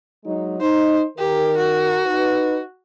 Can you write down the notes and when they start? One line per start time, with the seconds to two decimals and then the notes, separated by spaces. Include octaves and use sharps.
0.25 F#3 G#3 D#4
0.60 D#4 C5
1.18 D#3 G4 A#4
1.58 F#4
2.05 D#4 B4